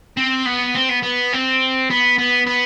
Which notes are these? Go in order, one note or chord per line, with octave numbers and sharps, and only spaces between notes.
C4
B3
C4
B3
B3
C4
B3
B3
B3